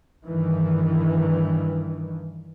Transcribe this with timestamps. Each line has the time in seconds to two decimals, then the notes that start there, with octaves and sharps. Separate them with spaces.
0.25 G2 D#3 E3